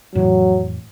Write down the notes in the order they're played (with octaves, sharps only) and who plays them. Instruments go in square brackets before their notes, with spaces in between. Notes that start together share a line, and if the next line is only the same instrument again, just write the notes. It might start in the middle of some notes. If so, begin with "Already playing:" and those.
[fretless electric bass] F2 A2 E3 [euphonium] F#3